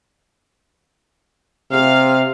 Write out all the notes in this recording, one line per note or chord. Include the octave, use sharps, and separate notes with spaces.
C3 F5